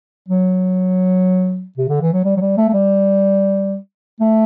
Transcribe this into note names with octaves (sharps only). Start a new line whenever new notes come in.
F#3
C3
D3
E3
F#3
G3
F#3
G3
A3
A3
G3
A3